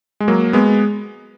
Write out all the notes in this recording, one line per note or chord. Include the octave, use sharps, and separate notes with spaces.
G#3
F#3 A#3
G#3 B3